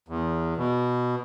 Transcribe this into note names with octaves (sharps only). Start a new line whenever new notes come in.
E2
B2